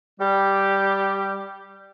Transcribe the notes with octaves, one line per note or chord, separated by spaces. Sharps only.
G3 G4